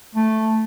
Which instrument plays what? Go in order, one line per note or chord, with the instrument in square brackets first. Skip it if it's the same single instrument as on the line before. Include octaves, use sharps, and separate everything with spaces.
[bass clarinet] A3